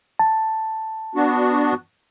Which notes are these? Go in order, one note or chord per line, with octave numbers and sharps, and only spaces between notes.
A5
B3 D4 F#4